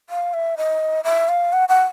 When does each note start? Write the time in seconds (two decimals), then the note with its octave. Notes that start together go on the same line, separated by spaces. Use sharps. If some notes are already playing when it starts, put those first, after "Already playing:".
0.10 F5
0.34 E5
0.57 D#5
1.04 E5
1.29 F5
1.53 F#5
1.69 F#5